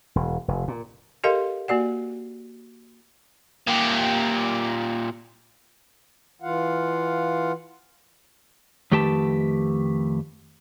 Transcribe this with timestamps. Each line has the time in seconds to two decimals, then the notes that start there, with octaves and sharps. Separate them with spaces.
0.16 E1
0.48 F1
0.68 A#2
1.24 G4 A4 A#4 D#5 F5 C6
1.68 A#3 F#4 D5 F#5
3.67 A#2 G4
6.42 E3 F4 F5 F#5
8.92 F2 D#3 A3 G4 B4 A5